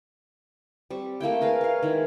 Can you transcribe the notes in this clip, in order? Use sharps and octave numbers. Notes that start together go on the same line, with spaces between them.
G3 C4 C#6
A3 A#3 E4 G5
G#4 A#4 B4 F5
C#5 F5
D#3 G#3 E4